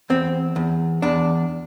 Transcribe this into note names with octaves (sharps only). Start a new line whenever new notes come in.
E2 C4
E2
E2 D4